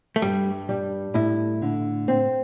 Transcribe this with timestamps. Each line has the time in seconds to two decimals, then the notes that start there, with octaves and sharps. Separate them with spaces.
0.16 A3
0.22 G2 G3
0.69 G3
1.14 A2 E4
1.62 D3
2.08 C4